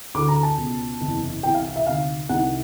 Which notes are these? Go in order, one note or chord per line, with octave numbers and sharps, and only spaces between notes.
D2 D3 D6
A#5
A5
C#2 B2
F#1 E2 C3 E3
C2 C3 E3 G5
F5
F5
E5
D2 C3 D#3 F5
C2 C3 D#3 F#5